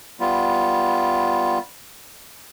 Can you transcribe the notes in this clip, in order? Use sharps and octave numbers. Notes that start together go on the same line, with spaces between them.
G3 B3 F4